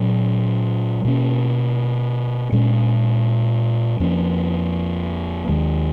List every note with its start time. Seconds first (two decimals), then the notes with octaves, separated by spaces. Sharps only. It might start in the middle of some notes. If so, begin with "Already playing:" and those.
Already playing: A#2 F#3 C#4
1.04 B2 A#3 C#4
2.52 A#2 G#3 C#4
4.00 F2 F3 A#3 C#4
5.48 D#2 D#3 G#3